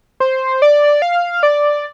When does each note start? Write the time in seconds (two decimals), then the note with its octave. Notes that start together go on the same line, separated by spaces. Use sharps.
0.20 C5
0.62 D5
1.02 F5
1.43 D5